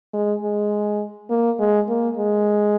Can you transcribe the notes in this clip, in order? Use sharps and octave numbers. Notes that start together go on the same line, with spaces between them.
G#3
G#3
A#3
G#3
A#3
G#3